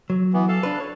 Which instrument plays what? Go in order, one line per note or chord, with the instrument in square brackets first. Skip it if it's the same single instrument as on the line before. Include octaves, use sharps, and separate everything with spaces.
[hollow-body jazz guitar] F#3
[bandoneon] E3 B3
A4 F5 A5
[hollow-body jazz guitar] D4 B4
C#5